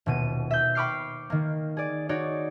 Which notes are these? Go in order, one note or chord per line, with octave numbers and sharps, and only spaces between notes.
D#1 B2 D#7
E5 G6
G5 B5 C#6 D6 F6 C7
D#3 A#3
G#4 D5
D#4 F#4 C#5 D5